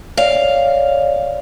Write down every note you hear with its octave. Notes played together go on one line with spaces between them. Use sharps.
C#5 D5 F5